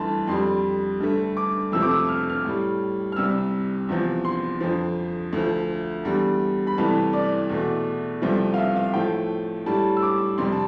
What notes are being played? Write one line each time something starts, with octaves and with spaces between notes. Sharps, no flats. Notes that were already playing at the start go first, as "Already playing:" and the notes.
Already playing: G2 E3 A3 A5 B5 C6
F2 D3 G3 C6
G2 D3 A3
D6
F2 C3 F3 A3 E6
D6
E6
F6
F6
A2 G3
F6
C2 C3 G3 E6
E2 C3 F3
C6
F2 D3 F3
D2 D3 F3
E2 D3 G3
B5
C2 C3 E3 A3 A5
D5
E2 B2 A3
C2 C3 F3 A3
F5
E5
F5
A2 F3 A3 G5
A2 G3 A5
E6
D6
F2 C3 G3 C6
A5